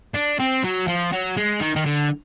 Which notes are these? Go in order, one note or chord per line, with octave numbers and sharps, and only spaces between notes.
D4
C4
F#3
F3
F#3
G#3
D#3
D#3
D3